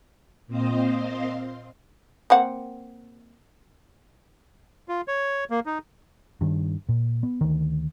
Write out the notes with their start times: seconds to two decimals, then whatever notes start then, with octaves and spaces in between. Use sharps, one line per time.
0.47 A#2 C4 C5 D#5 F5 C6
2.30 A#3 C4 F#5
4.88 F4
5.08 C#5
5.50 A#3
5.66 D#4
6.41 G2 D#3
6.89 A#2
7.23 B3
7.41 D2 D#3